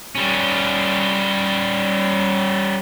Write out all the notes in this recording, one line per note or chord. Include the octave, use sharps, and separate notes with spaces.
G3 C#4